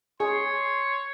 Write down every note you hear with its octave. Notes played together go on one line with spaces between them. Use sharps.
G#4 C#5 C6